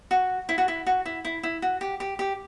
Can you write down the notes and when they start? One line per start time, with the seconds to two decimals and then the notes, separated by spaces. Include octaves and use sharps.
0.11 F#4
0.49 E4
0.58 F#4
0.68 E4
0.86 F#4
1.06 E4
1.25 E4
1.43 E4
1.62 F#4
1.81 G4
2.00 G4
2.19 G4